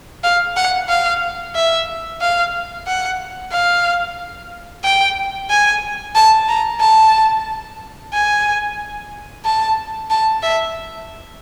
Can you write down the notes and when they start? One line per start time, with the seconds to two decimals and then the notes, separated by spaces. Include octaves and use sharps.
0.24 F5
0.56 F#5
0.89 F5
1.55 E5
2.21 F5
2.87 F#5
3.52 F5
4.84 G5
5.50 G#5
6.15 A5
6.49 A#5
6.81 A5
8.13 G#5
9.45 A5
10.10 A5
10.43 E5